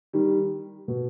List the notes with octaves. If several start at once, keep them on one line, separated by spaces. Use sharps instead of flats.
D#3 G3
B2